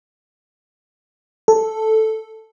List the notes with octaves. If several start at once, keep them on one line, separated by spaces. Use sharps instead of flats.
A4